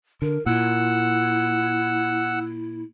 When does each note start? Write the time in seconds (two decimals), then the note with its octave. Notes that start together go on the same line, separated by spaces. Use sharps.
0.22 D3 A#4
0.46 A#2 E4 F#5 E6